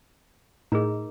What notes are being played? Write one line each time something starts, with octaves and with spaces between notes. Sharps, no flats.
A2 D#4 G#4 A#4 A#5